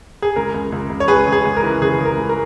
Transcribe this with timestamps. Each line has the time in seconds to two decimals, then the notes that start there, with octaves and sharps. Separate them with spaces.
0.22 G#4
0.36 C#2 A#4
0.54 C#2
0.72 C#2
0.90 C#2
1.00 C#5
1.08 C#2 G#4 B4
1.27 C#2
1.32 G#4
1.45 C#2
1.56 A#4
1.63 E3
1.82 C#3 G#4
1.99 C#3
2.05 A#4
2.17 C#2
2.29 A#4